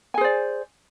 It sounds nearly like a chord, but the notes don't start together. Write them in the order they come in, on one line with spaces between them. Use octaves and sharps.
G#5 G#4 C5 D5